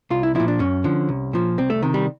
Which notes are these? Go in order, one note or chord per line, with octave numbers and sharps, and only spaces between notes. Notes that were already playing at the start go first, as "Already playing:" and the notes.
C2 F4
E4
A#2 F3 E4
D4
F#2 C#4
D3 F3
C2
A#2 F3
C2 C4
A3
C3 D#3
G3